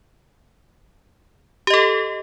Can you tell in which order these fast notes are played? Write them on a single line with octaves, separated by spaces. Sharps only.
G4 D#5 A4